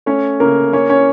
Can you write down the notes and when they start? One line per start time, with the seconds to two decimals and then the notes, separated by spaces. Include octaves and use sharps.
0.06 A3 C#4 C#5
0.40 C#3 A#3 A#4
0.73 A#3 C#4 C#5
0.90 C#4 C#5